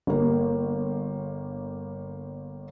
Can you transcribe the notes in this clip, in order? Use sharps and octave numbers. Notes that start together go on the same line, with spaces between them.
G1 A#3